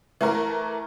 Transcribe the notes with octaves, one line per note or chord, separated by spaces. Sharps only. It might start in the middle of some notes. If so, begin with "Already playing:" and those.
E3 A3 A#4